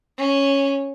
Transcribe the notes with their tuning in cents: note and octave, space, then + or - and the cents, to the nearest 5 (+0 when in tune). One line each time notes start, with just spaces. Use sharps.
C#4 -5